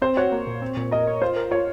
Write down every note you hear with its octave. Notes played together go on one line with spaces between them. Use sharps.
C4 C5
F#4 C#5
A#3
A#2
C4
A#2
A#4 D#5
C#5
F4 C5
A#4
F4 C#5